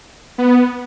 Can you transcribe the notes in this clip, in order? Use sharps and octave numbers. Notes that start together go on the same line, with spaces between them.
B3